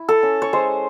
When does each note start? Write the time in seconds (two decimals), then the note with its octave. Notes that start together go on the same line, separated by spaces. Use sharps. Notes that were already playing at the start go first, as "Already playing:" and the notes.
Already playing: E4
0.09 A4
0.23 C#4
0.42 C#5
0.53 G#3 C5